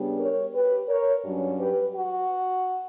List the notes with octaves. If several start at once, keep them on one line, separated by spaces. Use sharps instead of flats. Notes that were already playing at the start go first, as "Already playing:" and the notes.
Already playing: C#3 G3 B3 D4
A#4 C#5
G4 B4
A#4 C#5
G2 F#3 C#4
G4 B4
F#4